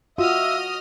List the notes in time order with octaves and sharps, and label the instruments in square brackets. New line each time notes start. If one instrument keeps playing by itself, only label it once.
[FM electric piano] F4 [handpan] F#4 [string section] D#5 D#6 F6 [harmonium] E5